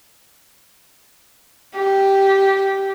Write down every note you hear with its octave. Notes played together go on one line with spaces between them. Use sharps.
G4